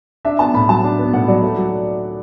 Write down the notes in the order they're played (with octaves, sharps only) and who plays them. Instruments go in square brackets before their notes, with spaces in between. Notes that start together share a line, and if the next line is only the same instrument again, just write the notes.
[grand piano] D4 [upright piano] E5
[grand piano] B3 [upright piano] A5
[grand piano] A2 [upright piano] B5
[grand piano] F#3 [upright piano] A5
[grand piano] D4
B3
[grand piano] A2 [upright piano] F#5
[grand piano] F#3 [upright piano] D5
[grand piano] A3
F#3